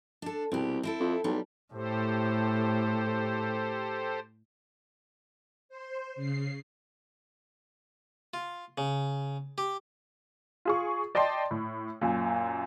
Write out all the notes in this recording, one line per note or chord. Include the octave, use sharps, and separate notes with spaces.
D4 A4
C2 B2 G4
C4 E4 A4
F2
B1 G3
A2 G4 A4 C5
C5
C#3 C7
F4
C#3
G4
F4 G#4 C#6
D5 D#5 G5 A5 C6
A2
F#2 A#2